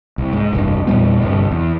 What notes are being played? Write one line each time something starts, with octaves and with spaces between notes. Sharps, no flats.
C2
G#2
F1 C2 G2
E2 A#2 G3 B3
G1 C2 G2
E2